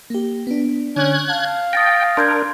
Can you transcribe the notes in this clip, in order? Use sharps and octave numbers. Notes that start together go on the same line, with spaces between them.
A#3 G4
B3 D4
D3 C#4 D4 F#6 G#6
F5 A5
G5 D#6 A6 A#6
D4 A#4 C6 G6 G#6